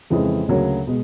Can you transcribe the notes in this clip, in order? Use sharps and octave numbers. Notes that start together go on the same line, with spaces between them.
F2 C#3 E3 G#3
D2 C#3 F#3 A#3
B2 G#3